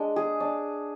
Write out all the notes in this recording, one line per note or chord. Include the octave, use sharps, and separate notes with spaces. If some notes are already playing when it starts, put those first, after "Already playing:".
Already playing: G#3 D4
G#4
D4